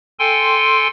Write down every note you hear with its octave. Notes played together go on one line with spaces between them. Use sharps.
A4 G5 G#5 C6